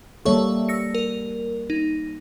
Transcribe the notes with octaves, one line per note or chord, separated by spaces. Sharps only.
G3 A#3 A4 C#5 E5 C#6
E6 A#6 C#7
A#4
D#4